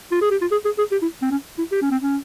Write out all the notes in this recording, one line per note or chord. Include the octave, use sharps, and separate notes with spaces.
F4
G#4
G4
F4
G#4
G#4
G#4
G4
E4
C4
C#4
E4
G4
C#4
C4
C#4